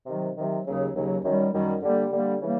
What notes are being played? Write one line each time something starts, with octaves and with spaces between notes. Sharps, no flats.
C3 D#3 F#3
C3 D#3 F#3
D#2 C#3 F#3
D#2 C#3 F#3
F#2 D#3 G3
F#2 D#3 G3
D3 G3 A#3
D3 G3 A#3
C#3 E3 G3 A#3